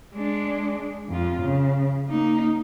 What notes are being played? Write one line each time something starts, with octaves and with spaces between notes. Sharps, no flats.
G#3 D4
F2 F4
C#3
A#3 D#4